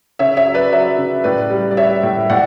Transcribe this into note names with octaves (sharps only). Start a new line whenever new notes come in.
C#3 C#5 E5
C#5 E5
F#3
B4 D5
F#3 C#5 E5
C#3
A2 B4 D5
G3
D5
G3 C#5 E5
A2
A2 D5 F#5